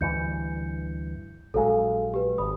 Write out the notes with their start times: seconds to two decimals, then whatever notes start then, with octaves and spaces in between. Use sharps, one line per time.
0.01 D2 G2 E3 G6 C#7
1.54 A#1 F#3 G#3 A4 F5
2.14 G4 B4
2.38 G#1 B5 D#6